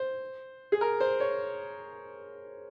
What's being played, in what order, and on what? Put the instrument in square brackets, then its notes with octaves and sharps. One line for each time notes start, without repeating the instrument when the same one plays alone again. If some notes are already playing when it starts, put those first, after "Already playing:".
Already playing: [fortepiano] C5
G#4
A#4
C5
C#5